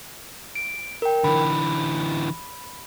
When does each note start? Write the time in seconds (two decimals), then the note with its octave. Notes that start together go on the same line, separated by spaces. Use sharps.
0.55 D7
1.02 A#4 G5
1.24 D3 E3 B5